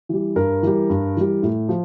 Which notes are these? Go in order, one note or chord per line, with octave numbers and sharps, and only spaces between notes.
E3 G3
G2 A#4
E3 G3
G2
E3 G3
A2
F3